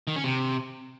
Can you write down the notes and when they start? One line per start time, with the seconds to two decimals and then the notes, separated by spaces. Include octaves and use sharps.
0.07 D#3
0.16 C#4
0.24 C3